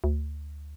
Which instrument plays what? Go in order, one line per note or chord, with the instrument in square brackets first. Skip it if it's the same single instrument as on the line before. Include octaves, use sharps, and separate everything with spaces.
[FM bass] D2